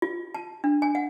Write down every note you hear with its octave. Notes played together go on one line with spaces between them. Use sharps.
F4
A5
D4
G#5
F#5